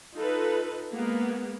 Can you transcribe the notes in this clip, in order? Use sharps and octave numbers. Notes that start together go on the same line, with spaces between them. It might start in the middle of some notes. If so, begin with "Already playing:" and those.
D#4 F4 A4 B4
G#3 A#3 B3